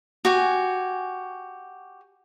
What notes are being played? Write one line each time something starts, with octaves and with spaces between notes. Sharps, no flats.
F#4 G4 G#5